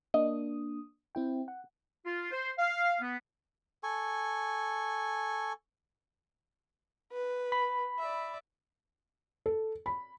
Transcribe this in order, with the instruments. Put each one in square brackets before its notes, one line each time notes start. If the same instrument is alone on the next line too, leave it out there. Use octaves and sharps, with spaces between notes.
[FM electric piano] A#3 D4 D#6 [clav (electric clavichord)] D#5
[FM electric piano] C4 E4 G5
F#5
[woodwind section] F4
C5
F5
B3
[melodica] A4 G#5 C#6
[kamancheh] B4
[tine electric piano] B5
[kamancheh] D5 E5
[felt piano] A4
B5